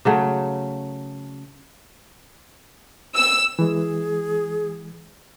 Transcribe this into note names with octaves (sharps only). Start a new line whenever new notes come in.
C#3 F#3 A3
E6
E3 G#3 G#4